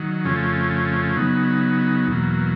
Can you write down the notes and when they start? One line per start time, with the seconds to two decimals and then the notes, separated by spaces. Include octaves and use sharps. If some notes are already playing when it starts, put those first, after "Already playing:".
Already playing: D#3 F#3
0.24 F2 C#3 F3 A3 C#4
1.16 C#3 F#3 B3 D#4
2.07 E2 B2 F#3 A#3